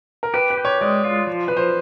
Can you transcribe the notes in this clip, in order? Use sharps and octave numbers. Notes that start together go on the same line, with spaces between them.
A#4
G4 B4
B4
G4
C#5
G#3 D5
F4
F3
F3 B4
C5